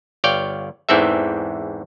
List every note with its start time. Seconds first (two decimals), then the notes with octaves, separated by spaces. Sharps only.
0.24 G1 C#5 D5 F5 G5
0.89 E2 G#2 E3 C4 A4 E5